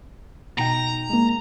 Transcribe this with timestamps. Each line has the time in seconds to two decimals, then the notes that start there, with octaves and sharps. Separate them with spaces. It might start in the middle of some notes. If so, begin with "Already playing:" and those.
0.58 B2 D#4 G5 A#5
1.10 G#3 A#3